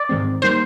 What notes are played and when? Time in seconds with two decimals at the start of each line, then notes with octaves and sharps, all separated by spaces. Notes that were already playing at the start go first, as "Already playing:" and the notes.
Already playing: D5
0.09 G#2 D#3 G#3 C4
0.42 D#3 G3 A#3 C5